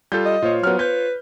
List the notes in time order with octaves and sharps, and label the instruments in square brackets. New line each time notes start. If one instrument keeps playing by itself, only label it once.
[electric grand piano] G3 F4 A4 [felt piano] G6
[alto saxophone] D#5
[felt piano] A#2 [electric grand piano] F4 C5 C#5
[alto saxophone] F#3 [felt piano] B3 F6
[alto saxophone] B4 [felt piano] G6